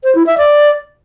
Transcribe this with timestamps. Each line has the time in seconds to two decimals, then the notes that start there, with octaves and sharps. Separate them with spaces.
0.04 C5
0.15 E4
0.27 E5
0.38 D5